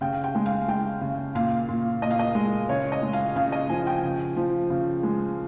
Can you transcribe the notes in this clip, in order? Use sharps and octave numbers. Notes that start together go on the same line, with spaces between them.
C#3 G5
F5
G5
G#3
F5
G#3 G5
C#3
A#2 F5
A#2
A#2 D#5
F5
D#5
G#3
C#3 C#5
D#5
G#3
F5
C#3 F5
D#5
F3 G#5
G5
C#3
F3
C#3
G#3